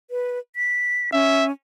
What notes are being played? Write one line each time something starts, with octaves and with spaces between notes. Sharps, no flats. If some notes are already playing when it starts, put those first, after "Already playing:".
B4
B6
C#4 E5